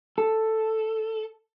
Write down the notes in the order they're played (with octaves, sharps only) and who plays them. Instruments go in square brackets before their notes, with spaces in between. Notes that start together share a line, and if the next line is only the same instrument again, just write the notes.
[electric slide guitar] A4